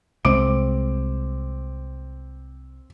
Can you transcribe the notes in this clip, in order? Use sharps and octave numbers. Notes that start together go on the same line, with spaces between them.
C2 G#3 C4 D6 D7